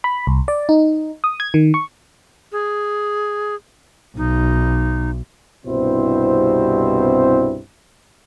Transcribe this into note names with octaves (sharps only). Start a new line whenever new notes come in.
B5
C2
D5
D#4
D#6
G#6
D#3
C#6
G#4
B1 D#4
C2 G2 B2 C4 E4 C5